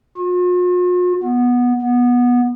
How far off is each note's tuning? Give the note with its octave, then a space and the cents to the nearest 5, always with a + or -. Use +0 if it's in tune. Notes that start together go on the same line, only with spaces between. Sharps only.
F4 +45
B3 -10
B3 -15